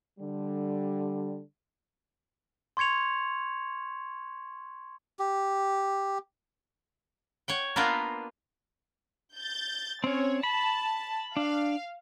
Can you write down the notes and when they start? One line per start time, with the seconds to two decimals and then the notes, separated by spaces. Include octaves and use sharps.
0.20 D3 G3
2.77 C6 C#6 G#6 C#7 F7
5.19 G4
7.48 C#5 F#5 G5
7.76 A#3 B3 D4 F4 A#4 B4
9.36 G6 A6
10.04 C4 C#4 C#5
10.43 A5 B5
11.37 D4 F5